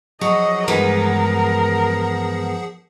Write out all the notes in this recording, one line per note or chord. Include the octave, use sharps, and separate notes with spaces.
F3 F#3 G#4 D#5 F#5
G2 E3 G#3 B3 A#4 B4